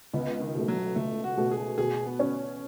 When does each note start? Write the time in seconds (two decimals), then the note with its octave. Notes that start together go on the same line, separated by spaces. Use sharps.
0.13 C#2 B3
0.40 D#3
0.55 B2 A3
0.68 F#3
0.96 C#2 A3
1.24 F#4
1.37 B2 A3
1.51 G#4
1.78 B2 G#4
2.06 B3
2.19 C#4